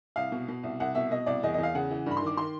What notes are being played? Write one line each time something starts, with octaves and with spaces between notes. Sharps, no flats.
C2 F5
B2
B2
C2
C2 F#5
B2 E5
B2 D#5
C2 D5
E2 D#5
E2 D#5
F5
C#3 F#5
E3
G2 B5
C6
D#3 D6
D#3 C6